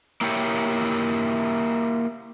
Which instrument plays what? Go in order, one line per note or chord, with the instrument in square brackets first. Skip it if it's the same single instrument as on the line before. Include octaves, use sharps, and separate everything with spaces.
[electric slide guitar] A#3 E4 G4 C#5